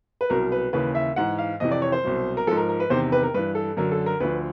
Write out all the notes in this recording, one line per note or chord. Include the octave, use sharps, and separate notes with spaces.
B4
C2 B2 F#3 A#4
B4
D#2 C#3 E3 B4
E5
G#2 E3 F#5
F5
F2 C3 E3 D#5
D5
C#5
C5
C2 B2 F#3
A#4
G#2 F3 A4
A#4
A#4
B4
E2 C3 D#3 C5
B4
A#4
G2 E3 B4
A4
F#2 D3 F#3 A#4
A4
A#4
D2 D3 F3 B4